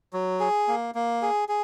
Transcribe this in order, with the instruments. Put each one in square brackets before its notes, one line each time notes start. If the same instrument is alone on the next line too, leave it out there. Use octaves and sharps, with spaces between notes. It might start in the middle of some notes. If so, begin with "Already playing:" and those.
[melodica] F#3
G#4
A#3
A#3
G#4
G#4